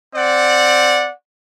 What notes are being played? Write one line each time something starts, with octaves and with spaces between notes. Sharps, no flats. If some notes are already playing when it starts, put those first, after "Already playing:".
C4 D5 F#5